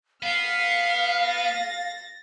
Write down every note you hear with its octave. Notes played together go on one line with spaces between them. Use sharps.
B3 F5 F6 C7
A6 A#6